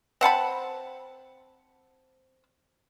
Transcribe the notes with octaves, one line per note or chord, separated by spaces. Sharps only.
C4 F#5 A5 B5